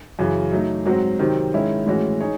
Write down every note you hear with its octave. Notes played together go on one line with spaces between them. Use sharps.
F#2 C#3 E3
F#3 A3 D#4
G#2 F#3 C4 F#4
C3 D#3 F#3 C4
G#2 D#3 G#3 C#4 E4
A2 E3 G#3 C#4 F#4
D#4 G#4 C#5